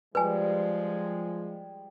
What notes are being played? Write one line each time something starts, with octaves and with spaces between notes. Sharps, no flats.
F3 G3 G#3 B4 G#5